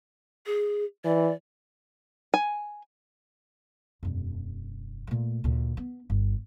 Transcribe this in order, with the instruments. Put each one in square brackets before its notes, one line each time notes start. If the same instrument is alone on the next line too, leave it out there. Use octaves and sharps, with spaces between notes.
[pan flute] G#4
[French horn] E3 [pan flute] D5
[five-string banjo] G#5
[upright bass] E1 F#2
A#2 A3
D2 A#2
B3
G1